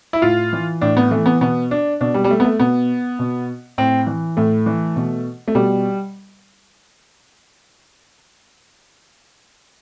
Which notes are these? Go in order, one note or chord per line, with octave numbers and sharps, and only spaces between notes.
E4
A2 F4
E3
A2 D4
B3
E3 A3
B3
B2 B3
D4
B2 D4
G3
G3
A3
B3
A3
B2 B3
B2
A2 C4
E3
A2 A3
E3
B2
A3
B2 G3